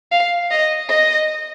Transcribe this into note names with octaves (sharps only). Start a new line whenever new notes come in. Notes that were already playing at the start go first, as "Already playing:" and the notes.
F5
D#5
D#5